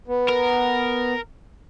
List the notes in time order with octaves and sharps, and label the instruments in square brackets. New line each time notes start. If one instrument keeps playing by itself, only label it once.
[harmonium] B3
[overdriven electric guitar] A#4